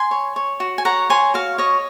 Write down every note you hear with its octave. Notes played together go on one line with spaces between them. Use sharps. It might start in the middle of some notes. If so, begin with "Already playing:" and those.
Already playing: G#5 C6
C#5
C#5
F#4
G#5
C#5 F#5 A#5
C#5 G#5 C6
F#4 F5
C#5 D#5